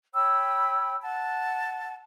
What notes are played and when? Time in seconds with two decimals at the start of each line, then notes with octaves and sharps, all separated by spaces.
0.14 C#5 G5 B5 E6
1.02 F#5 A5